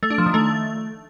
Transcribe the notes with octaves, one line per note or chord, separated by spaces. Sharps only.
A3
D4
F3
D#3
A3